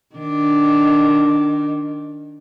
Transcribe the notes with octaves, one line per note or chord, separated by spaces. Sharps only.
D#3 D4